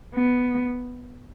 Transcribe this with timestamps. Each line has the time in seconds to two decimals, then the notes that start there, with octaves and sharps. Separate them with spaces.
0.14 B3